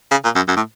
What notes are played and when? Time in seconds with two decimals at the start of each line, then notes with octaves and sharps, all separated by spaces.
0.11 C#3
0.24 A#2
0.35 F#2
0.48 F#2
0.56 A2